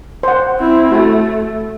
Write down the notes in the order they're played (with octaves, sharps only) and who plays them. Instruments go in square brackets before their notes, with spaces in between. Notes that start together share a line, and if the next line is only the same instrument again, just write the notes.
[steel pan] C5 F#5
[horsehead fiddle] C4 E4
[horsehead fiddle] A3 [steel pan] F#4